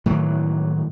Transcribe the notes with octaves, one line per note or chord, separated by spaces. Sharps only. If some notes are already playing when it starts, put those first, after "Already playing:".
A2 D#3 E3 F#3